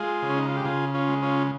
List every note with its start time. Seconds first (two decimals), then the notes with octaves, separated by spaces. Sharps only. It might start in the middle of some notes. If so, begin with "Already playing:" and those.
Already playing: G#3 F4 G#4
0.22 C#3
0.29 C#4
0.38 D#4
0.47 F4
0.57 G4
0.65 C#3 F4 G#4
0.94 C#4 F4
1.08 G#3
1.23 C#4 F4